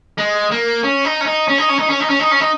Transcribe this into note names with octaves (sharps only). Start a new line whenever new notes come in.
G#3
A#3
C#4
D#4
C#4
D#4
C#4
D#4
C#4
D#4
C#4
D#4
C#4
D#4
C#4
D#4